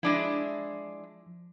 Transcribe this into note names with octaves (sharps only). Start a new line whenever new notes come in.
F3 G#3 D4 E4